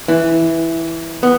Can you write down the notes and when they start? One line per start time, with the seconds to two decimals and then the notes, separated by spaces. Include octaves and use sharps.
0.08 E3
1.23 B3